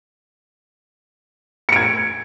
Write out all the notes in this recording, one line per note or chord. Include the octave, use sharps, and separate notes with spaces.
G#6 C#7 D7